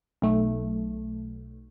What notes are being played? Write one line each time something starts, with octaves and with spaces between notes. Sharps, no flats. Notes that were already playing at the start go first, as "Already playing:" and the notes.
B1 A3